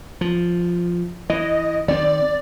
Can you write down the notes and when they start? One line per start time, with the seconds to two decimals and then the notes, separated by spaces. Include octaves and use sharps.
0.21 F3
1.30 E3 D#5
1.88 D#3 C4 D5